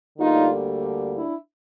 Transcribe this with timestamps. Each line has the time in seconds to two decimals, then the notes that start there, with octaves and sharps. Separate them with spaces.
0.18 D2 D3 G3 A#3 D#4 F4
1.14 D4 E4